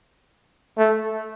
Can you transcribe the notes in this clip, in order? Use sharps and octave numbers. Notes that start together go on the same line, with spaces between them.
A3